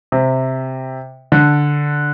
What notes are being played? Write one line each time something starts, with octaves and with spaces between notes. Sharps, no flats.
C3
D3